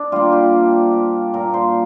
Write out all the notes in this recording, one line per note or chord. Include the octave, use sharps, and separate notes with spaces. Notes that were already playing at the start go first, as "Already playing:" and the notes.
Already playing: D4
G3 A#3 F4
G4
C3
A#3
A#2 A#4
C5